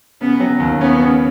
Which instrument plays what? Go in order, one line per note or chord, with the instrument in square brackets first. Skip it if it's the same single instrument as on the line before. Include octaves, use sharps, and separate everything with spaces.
[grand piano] C#3 [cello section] B3
[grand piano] F#3
D#2
[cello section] B3 [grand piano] C#4
[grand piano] C#3